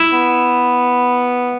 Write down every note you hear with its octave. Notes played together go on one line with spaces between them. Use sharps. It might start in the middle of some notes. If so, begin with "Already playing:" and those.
Already playing: E4
B3